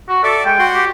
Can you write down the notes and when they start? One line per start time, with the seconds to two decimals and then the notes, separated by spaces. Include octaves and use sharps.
0.09 F#4
0.23 A4 D5 E5
0.45 G#3 G5
0.59 F#4 C6
0.74 G4